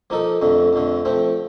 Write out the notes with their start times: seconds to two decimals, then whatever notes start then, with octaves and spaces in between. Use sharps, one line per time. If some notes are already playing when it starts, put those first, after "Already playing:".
0.10 F3 A#3 D#4 A4
0.42 F2 D3 A3
0.73 F2 D3 A3
1.05 F3 A3 C4